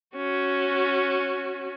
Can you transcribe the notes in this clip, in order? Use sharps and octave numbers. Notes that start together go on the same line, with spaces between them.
C#4 F#4